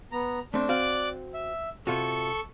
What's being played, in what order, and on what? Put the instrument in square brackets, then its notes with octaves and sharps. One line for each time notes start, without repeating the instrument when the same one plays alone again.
[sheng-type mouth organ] B3 A#5
[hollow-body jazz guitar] A3 C4 [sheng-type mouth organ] D4
[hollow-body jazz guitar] C4 F#4 F5 [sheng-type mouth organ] D5 D6 F#6
[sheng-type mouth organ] E5
[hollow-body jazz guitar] C3 F4 F#4 [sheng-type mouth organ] A4 C#6